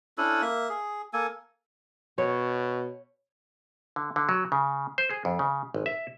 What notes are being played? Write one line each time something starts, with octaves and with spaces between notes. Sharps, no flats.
C#4 D4 E4 A4
A#3 E5
G#4
A#3 A4 G#5
B2 C#5
D3
D3
F#3
C#3
C5
G#4
F2
C#3
G#1
E5